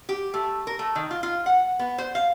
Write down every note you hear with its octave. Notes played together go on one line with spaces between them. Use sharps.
G4
A3
A#4
A3
D#3
F4
F4
F#5
B3
C5
F5